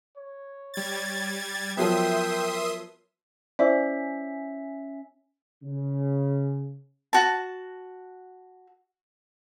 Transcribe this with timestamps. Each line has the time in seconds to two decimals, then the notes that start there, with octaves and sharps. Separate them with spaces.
0.17 C#5
0.74 G3 G#6 A6
1.77 F3 F#3 B3 A#4 E5 G5 C6 D#6
3.59 C#4 E4 C5 D5 E5
5.63 C#3
7.13 F#4 A5